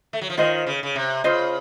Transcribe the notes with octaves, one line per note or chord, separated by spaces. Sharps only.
A3
F#3
F3
D#3 F4 C5 D#5
C#3
C#3
C3
C#3 F4 C5 D#5